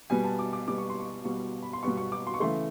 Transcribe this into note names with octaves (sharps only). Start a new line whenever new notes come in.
B2 G3 B3 G#5
A5
D6
D6
B2 G3 B3 D6
C#6
C6
C#6
B2 G3 B3 C#6
B5
C6
B2 G3 B3 C#6
C#6
D6
C6
C#6
C#3 E3 A3 C6